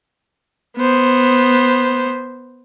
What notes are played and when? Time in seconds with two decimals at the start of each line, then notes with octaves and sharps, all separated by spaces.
0.77 B3 C5